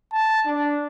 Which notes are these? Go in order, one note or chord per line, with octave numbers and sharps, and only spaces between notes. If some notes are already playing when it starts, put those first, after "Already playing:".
A5
D4